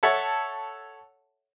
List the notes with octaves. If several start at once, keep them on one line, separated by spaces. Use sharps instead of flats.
A4 C#5 E5 F#5 A5